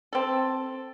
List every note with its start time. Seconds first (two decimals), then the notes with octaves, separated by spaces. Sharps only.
0.13 C4 A4